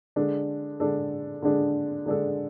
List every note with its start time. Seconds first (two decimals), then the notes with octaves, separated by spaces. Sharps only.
0.16 D3 G#3 D4 A4
0.80 D3 G#3 D4 A4
1.43 D3 G#3 D4 A4
2.06 D3 G#3 D4 A4